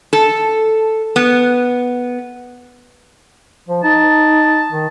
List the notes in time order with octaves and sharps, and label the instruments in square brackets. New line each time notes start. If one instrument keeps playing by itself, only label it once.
[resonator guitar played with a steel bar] A4
B3
[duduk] F3
[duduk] D#4 [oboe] A5
[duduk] D#3